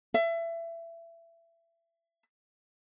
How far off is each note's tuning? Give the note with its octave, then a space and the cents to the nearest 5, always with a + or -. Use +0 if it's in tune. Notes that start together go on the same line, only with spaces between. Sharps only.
E5 +25